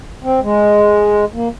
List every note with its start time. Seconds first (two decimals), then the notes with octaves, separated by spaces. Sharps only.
0.23 C4
0.42 G#3
1.33 A#3